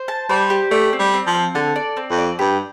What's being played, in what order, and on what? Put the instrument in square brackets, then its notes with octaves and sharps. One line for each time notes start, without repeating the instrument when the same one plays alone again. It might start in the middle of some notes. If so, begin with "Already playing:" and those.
Already playing: [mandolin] C5
A5
[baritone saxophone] G3 [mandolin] C5
[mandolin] G4
[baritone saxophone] A3 [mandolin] D5
[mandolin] C4
[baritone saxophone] G3
[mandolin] C4
[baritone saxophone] F3
[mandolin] C4
[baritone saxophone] D3 [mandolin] A4
[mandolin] D5
C4
[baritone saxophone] F2
[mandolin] D5
[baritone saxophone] G2 [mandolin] G4